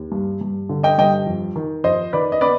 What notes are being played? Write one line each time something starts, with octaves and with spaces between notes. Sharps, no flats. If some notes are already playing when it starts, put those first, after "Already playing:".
Already playing: D#2
G2
G2
D3
D#5 G5
G2 D#5 G5
F2
D#3
F2 C5 D#5
D#3 B4 D5
D#5
B3 B4 D5